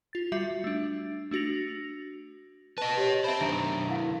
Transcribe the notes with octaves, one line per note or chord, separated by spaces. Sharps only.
F4 A6
G3 F#4 E5 C7
A3 D4
A3 D4 F#4 A#6 F7
B4 D#5 A5
G4 C#5
C5 E5 G5 A5 B5
F#2 D#3 D4 A#5 D7
E4 F5 F#5